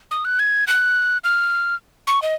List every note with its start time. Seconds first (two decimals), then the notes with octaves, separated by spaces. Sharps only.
0.11 D#6
0.25 F#6
0.39 G#6
0.67 F#6
1.24 F6
2.07 C#6
2.22 D#5